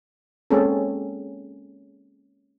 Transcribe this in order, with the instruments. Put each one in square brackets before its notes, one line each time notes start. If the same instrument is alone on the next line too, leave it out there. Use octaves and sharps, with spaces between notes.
[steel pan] G#3 A#3 C4 C#4 G#4 A4